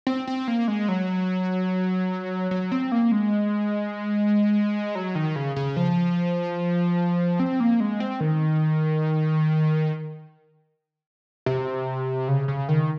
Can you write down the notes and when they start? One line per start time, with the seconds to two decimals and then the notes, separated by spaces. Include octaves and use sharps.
0.07 C4
0.27 C4
0.48 A#3
0.68 G#3
0.88 F#3
2.51 F#3
2.72 C4
2.92 A#3
3.12 G#3
4.95 F#3
5.15 D#3
5.36 C#3
5.56 C#3
5.77 F3
7.39 C4
7.60 A#3
7.80 G#3
8.00 C4
8.20 D#3
11.46 C3
12.28 C#3
12.48 C#3
12.69 D#3